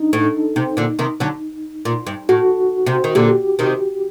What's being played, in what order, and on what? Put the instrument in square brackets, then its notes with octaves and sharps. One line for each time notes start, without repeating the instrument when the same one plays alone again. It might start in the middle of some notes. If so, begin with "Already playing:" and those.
Already playing: [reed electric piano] D4 D#4
[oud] A2
C3
A#2 D3
C3 D#3
D3 F#3
A#2
G2
[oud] A2 [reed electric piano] F#4
[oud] C3
D#3
[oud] A#2 D3 [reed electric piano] G4
[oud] C3 D#3